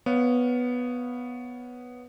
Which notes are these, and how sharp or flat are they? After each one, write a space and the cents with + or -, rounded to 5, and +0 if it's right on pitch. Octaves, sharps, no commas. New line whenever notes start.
B3 +0 C#5 +0 F5 +15